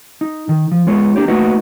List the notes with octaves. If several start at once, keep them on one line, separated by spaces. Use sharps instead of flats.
D#4
D#3
F3
G#3 B3 F4 C#5
A#3 D4 G4
A3 A#3 D#4 F#4 B4 D#5